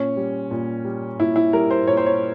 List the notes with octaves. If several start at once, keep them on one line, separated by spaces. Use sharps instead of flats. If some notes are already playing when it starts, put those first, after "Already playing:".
Already playing: A#2 C#4
G3
A#2
G3
A#2 E4
E4
G3 A#4
C5
A#2 C#5
C5
C#5